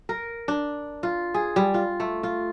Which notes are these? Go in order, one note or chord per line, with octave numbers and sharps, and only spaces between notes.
A#4
D4
F4
G#4
G3
F4
A3
F4